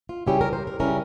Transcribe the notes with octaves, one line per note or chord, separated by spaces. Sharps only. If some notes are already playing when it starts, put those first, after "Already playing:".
F4
C#3 G3 C#4 E4 G4
A#4
C5
A#4
C#3 G3 C#4 E4 A#4